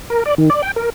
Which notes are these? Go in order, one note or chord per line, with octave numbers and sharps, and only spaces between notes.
A#4
D5
D#3
D5
G5
A#4